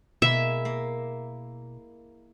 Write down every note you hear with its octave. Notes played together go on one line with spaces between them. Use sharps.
B2 G#3 A#3 E4 E5
A#3